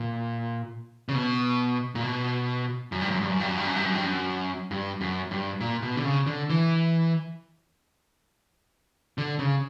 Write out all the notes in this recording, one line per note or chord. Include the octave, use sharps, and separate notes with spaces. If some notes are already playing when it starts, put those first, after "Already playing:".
Already playing: A#2
C#3
B2
A#2
B2
F#2
G2
F#2
G2
F#2
G2
F#2
G2
F#2
G2
F#2
G2
F#2
G2
F#2
G2
A#2
B2
D3
C#3
D3
E3
D3
C#3